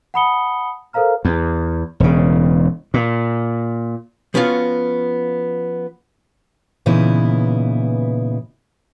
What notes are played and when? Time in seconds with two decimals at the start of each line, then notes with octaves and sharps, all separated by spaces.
0.14 F#5 A5 B5 D#6 C#7 G7
0.93 A4 A#4 C5 F5 A#5 F6
1.25 E2
2.00 E1 C#3
2.94 A#2
4.34 F3 B3 C#4 D4 F4 F#4
6.86 A#2 C#3 E3 B3 D#4 E4